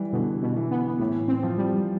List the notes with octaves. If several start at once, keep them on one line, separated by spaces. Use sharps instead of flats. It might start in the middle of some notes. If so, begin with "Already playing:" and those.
Already playing: E3 G3
B2 D3
B2
E3
B3
A2 E3
C4
F3
G3